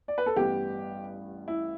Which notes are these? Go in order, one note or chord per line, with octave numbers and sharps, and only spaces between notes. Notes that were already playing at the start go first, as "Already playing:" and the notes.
D5
B4
A4
A1 G2 G3 B3 G4
E4